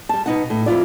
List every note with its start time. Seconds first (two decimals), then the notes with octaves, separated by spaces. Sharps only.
0.09 G3 A5
0.26 B2 D#4 F#5
0.50 A2
0.66 F2 E4 F4 D5